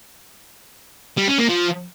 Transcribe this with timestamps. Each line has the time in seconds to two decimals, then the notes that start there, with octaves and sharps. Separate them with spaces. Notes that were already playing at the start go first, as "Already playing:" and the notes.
1.18 G3
1.28 C#4
1.39 A#3
1.49 F3